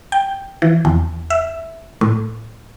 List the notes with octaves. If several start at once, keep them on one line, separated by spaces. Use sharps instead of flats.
G5
E3
E2
E5
A2